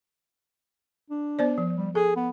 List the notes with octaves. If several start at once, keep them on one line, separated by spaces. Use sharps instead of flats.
D4
B3 C5 D5
F3
G3
G#4 A4
B3